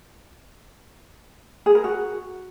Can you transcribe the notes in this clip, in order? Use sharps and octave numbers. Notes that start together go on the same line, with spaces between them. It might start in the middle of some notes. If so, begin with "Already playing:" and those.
G#4
A#4
F#4